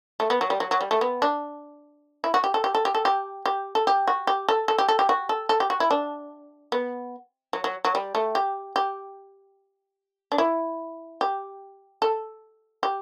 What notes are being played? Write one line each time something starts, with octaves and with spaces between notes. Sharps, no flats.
A3
B3
F#3
G3
F#3
F#3
G3
A3
B3
D4
E4
F#4
G4
A4
G4
A4
G4
A4
G4
G4
A4
G4
F#4
G4
A4
A4
G4
A4
G4
F#4
A4
A4
G4
F#4
E4
D4
B3
F#3
F#3
F#3
G3
A3
G4
G4
D4
E4
G4
A4
G4